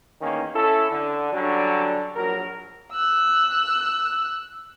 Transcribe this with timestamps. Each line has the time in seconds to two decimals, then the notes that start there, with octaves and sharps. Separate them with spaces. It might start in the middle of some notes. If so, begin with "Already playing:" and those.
0.21 E2 D#3 A#3 C#4
0.55 C#4 E4 A4
0.90 D3
1.32 D3 F#3 G3 C#4 D4
2.16 A#1 F#3 A#4
2.92 E6 F#6